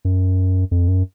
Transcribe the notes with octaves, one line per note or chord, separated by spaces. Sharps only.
F#2
F2
F#2